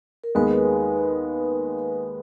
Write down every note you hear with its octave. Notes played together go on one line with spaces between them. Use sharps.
A#4
D#2 D#3 G#3 B3 B4